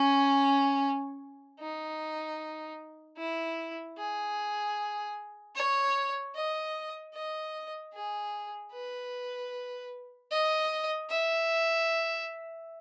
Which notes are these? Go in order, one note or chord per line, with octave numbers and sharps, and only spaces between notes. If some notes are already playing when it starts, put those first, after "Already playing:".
Already playing: C#4
D#4
E4
G#4
C#5
D#5
D#5
G#4
B4
D#5
E5